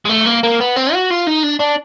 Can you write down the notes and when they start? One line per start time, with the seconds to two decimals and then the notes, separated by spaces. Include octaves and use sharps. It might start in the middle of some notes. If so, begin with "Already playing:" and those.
0.05 G#3
0.09 A3
0.26 A#3
0.43 A#3
0.60 B3
0.76 C4
0.93 F#4
1.11 F4
1.27 D#4
1.44 D4
1.60 D4